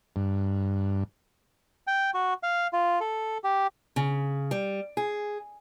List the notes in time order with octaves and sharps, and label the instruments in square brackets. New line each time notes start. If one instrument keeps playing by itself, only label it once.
[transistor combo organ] G2
[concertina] G5
F#4
F5
F4
A4
G4
[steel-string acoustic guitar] C#3
G3
G#4